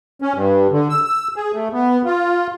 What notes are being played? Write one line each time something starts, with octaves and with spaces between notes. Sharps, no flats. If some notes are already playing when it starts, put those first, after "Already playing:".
C#4
G2
D3
E6
E6
G#4
A3
B3
F4